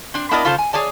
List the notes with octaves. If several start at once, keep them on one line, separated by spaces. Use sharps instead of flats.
C4 D4
B3 D4 E4 A#4 D5 D#5
C#3 F4 A4 C5
G#5
G#4 C#5 D5 A5